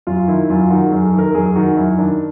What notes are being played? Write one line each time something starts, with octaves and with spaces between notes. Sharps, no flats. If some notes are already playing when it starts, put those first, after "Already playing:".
F#2 F4
D#3 E4
F#2 F4
D#3 F#4
G#4
F#2
A4
D#3
A#4
F#2 G#4
D#3 F#4
F#2 E4
D#3 D4